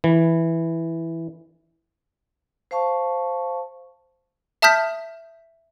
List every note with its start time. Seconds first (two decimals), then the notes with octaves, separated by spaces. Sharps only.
0.04 E3
2.71 C5 F5 A5 C#6
4.62 E5 A5 D#6 F6 G6 B6